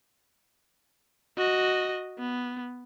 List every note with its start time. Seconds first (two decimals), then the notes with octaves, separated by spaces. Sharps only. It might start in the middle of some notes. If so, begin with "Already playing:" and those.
1.38 F#4 D#5
2.19 B3